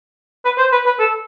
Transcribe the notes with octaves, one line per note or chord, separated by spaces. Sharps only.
B4
C5
B4
B4
A4